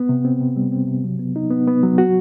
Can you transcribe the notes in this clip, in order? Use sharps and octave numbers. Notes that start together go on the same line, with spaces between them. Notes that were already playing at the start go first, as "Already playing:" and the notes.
Already playing: B3
C3
C4
C3
G3
C4
C3
F#3
B3
D#4
B3
B3
F#3
F#4